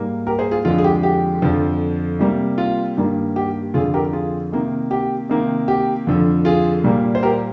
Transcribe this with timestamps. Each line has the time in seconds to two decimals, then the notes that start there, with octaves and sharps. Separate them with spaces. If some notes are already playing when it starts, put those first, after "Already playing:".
Already playing: G#2 G3 A#3
0.27 G4 A#4
0.39 G#4 C5
0.51 F4 G#4
0.65 F2 D3 F3 G#3 F4
0.78 G#4
0.84 G4
1.03 G4
1.42 F2 D3 F3
2.19 C3 G3 A#3
2.58 F4
2.97 G2 D#3 G3 A#3
3.36 G4
3.74 F2 D3 F3 F4 G#4
3.94 G4 A#4
4.13 F4 G#4
4.52 C3 D#3 A#3
4.91 G4
5.30 C3 D#3 A#3
5.68 G4
6.07 F2 D3 F3
6.45 F4 G#4
6.84 A#2 G3 A#3
7.15 C5
7.23 G4 A#4